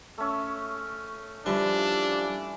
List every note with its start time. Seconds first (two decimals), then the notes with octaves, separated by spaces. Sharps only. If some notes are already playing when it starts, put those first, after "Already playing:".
0.18 A3 C#4
1.46 E3 F3 G3 D4